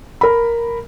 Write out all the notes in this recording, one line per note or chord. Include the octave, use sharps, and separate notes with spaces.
A#4 B5